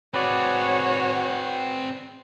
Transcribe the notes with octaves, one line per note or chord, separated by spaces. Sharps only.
C4 F#4 G#4 B4 C#5 D5